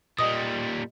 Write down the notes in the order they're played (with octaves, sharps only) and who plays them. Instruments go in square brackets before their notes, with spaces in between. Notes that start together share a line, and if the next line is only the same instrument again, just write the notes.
[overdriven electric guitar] A#2 G3 [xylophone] D#5 D#6